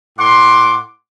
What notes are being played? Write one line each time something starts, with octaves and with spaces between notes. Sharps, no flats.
A2 F#5 C6 D6